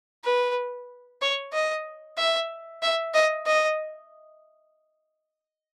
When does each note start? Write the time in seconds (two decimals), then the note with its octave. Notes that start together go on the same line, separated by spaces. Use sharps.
0.24 B4
1.22 C#5
1.53 D#5
2.18 E5
2.83 E5
3.14 D#5
3.47 D#5